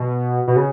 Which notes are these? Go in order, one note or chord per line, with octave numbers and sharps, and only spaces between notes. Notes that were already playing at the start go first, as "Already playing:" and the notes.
Already playing: B2
B2
C#3